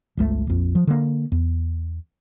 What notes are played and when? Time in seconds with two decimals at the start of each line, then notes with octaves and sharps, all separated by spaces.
0.17 G1 C#2 A3
0.47 A#1 F2
0.75 F3
0.87 D3 A#3
1.32 E2